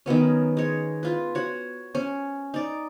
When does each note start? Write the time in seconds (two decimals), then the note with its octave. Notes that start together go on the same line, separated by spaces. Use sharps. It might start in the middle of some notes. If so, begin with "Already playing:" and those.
0.06 D#3 F#3 B3 C#4
0.57 G#3 C#5
1.03 F4 B4
1.35 F#4 C#5
1.95 C#4
2.54 D#4 D5